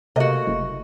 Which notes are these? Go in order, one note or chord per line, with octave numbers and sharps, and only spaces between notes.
C3 A3 A#3 F#4 D#5
F#1